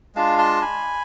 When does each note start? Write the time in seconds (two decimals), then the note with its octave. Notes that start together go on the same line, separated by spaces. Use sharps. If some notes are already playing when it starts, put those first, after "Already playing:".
0.15 G#3 D4 F4 F5 A5
0.38 A5 C6
0.61 G#5 B5